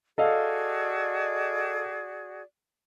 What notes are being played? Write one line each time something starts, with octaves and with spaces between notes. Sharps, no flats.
F#4 G#4 A4 D5 D#5 F5